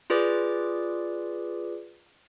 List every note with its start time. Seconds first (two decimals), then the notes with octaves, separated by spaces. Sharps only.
0.10 F4 G#4 B4 D5 D6